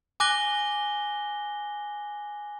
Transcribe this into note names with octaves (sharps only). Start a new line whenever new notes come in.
G#5 D6 F#6 A#6 G7